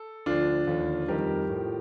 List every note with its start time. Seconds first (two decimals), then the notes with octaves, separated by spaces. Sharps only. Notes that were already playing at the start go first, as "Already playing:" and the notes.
Already playing: A4
0.26 D2 D3 F3 D4 F4
0.67 D#2 D3 F3
1.08 F2 D#3 G3 G4 A#4
1.49 A2 F3